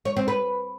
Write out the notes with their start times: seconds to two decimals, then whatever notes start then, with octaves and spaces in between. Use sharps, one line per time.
0.05 C#5
0.17 C4
0.28 B4